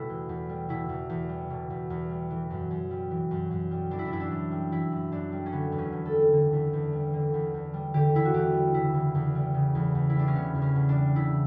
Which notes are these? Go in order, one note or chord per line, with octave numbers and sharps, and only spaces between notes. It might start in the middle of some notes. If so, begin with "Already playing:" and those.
Already playing: B2 G3 A3 B3 E4
E2
E2
G3
B2 E4
E2
E2
G3
B2
E2
E2
G3
E3
F#2
F#2
G3
E3
F#2
F#2
G3
E3 D4
E4
D4
F#2 E4
D4
F#2
G3
E3 E4
F#2
F#2 D4
G3
C#4
D3 B3
E2
C#4
E2
A4
G3
D3
E2
E2
G3
D3
E2
E2
G3
D3 G4
E2 E4
F#4
E2 G4
G3
C#3 E4
E2
E2
G3
C#3
E2
E2
E4
G3 D4
C#4
C#3 B3
E2
C#4
E2
D4
G3
C#3 E4